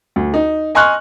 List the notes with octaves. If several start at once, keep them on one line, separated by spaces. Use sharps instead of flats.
D2
D#4
D#5 G#5 C6 C#6 F6 F#6